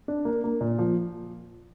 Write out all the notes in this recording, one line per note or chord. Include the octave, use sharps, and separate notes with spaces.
D4
A#3
A#3
A#2
F3